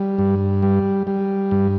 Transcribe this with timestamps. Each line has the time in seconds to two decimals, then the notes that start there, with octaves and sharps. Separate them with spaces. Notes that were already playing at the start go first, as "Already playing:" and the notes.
Already playing: G3
0.19 G2
0.63 G3
1.07 G3
1.51 G2